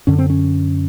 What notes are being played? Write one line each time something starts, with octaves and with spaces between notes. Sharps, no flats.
F#2 D3 C#4
C4
C#4